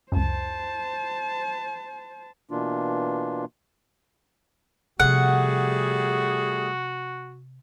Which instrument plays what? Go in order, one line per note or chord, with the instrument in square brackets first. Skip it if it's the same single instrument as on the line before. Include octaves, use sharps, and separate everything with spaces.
[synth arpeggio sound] C#2 F#2 [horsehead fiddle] C5 A5
[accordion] B2 E3 A#3 D4 F4
[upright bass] C3 F3 [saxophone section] G3 A3 G#4 [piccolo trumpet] F#4 [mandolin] F#5